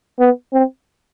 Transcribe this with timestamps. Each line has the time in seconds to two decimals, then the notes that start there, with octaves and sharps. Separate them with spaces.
0.19 B3
0.53 C4